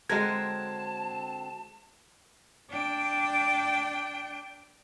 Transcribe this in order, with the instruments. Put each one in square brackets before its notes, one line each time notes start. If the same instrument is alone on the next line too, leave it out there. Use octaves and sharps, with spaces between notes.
[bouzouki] D3 F#3 C4 [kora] G#3 A#4 [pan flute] A5 [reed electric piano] G#6
[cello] D4 G5